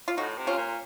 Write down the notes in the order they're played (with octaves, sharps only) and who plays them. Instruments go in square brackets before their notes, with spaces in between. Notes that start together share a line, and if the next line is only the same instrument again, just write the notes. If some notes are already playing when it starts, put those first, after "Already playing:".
[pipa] F4
[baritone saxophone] A2 [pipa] D#4 F#4
[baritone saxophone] C3
[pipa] C#4 F4
[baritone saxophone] A#2